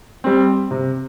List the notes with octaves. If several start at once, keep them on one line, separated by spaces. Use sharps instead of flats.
G3 C4
C3